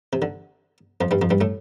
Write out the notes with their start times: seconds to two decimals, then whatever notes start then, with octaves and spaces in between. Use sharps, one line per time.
0.13 C3
0.22 D3
1.01 F2 F3
1.11 G2 G3
1.22 F2 F3
1.30 G2 G3
1.41 A2 A3